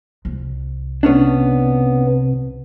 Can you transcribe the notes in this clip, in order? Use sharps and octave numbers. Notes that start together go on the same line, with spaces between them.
C2
C3 B3 C#4 D4